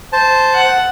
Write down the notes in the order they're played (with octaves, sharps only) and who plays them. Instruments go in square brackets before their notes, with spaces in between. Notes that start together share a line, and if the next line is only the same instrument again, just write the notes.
[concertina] C5 A5
[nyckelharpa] F#5